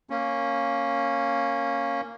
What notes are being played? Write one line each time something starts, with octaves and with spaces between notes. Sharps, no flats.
A#3 C#4